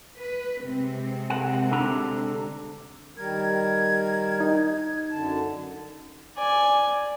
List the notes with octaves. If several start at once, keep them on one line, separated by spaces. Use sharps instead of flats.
B4
C3 G#3 C4
A#4 F#5
D3 D4 A#5
D#3 G3 A#4 G#6
D#4
F#2 D3 A5
D5 G#5